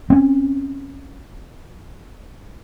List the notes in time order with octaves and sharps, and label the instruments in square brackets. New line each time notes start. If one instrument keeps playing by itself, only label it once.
[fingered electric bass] C4 C#4